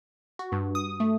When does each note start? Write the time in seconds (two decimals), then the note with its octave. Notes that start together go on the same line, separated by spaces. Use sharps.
0.39 F#4
0.52 G2
0.75 D#6
1.00 A3